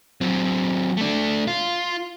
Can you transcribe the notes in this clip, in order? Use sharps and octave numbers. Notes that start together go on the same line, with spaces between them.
F#3 C4
A3 D4
F4